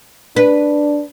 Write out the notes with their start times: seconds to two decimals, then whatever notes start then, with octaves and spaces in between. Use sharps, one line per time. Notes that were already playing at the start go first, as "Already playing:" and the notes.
0.36 D4 B4